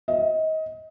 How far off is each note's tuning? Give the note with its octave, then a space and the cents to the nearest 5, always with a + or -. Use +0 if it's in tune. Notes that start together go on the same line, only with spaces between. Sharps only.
D#5 +25